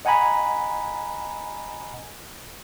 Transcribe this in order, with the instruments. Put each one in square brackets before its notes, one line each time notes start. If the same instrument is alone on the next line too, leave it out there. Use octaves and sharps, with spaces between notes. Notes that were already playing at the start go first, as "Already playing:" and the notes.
[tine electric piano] D#5 F#5 G#5 A#5 B5